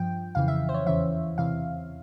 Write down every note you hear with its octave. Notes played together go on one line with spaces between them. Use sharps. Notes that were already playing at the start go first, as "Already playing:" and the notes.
Already playing: G2 F3 G5
F2 C#3 E3 F5
E5
C5
C#5
E2 C#3 E3 E5
E2 C3 E3 F5